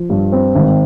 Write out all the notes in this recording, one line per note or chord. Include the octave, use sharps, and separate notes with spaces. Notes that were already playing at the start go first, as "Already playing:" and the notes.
Already playing: F3
G2
C4
G#1